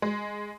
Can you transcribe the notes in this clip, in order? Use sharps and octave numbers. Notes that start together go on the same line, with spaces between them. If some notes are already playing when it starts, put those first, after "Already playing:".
G#3